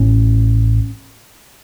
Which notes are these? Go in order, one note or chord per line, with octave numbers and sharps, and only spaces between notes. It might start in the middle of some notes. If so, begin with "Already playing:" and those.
Already playing: A1 A2 C#4